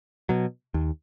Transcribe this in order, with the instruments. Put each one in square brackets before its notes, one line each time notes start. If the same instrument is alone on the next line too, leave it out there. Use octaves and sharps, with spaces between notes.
[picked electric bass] B2 F#3
D#2